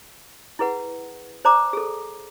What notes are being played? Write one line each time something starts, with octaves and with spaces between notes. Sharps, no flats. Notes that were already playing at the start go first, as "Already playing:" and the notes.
E4 G#4 B4 F#5
C5 D5 A5 A#5 D6
G#4 A4